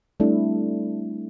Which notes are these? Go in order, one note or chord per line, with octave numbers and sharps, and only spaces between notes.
G3 A3 C4 D4 E4